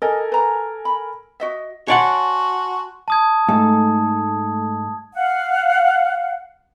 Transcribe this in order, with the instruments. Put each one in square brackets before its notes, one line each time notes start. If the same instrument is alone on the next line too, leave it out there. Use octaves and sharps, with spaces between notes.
[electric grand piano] A4 A#4 G#5 [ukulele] D#5
[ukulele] B4 A#5
B5
F#4 D#5 E5
[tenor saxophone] F#4 [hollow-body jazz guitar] C#5 D5 F#5 [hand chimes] G#5 A5 C6
[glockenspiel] A5 D#6 G#6
[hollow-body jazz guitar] G#2 [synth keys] A3
[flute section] F5 F#5